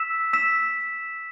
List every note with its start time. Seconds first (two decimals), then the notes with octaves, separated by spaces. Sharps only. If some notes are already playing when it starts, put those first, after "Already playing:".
Already playing: E6 B6 E7
0.33 E6 B6 E7